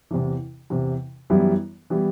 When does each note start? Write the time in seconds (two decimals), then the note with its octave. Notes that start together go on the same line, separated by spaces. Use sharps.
0.11 E2 C3 E3
0.70 E2 C3 E3
1.30 F#2 E3 G3 B3 E4
1.90 E3 G3 B3 E4